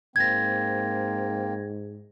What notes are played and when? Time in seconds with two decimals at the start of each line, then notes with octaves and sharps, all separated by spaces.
0.16 G#2 A#3 C4 G#6 A#6